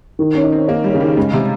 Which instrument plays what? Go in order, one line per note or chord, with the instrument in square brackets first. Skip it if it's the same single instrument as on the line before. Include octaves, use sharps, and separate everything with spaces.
[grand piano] D#3
[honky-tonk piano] C#4
[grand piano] D#4
[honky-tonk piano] C4
[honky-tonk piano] A#3 [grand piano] D#4
[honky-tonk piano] G3
[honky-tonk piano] C#3 [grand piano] G#4
[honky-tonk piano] D#3
[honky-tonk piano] C#3 [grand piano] G#3
[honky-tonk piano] C3